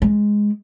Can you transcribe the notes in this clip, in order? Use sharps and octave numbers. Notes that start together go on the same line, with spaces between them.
G#3